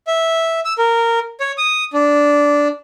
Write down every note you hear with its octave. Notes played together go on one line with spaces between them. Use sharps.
E5
E6
A#4
C#5
D#6
D4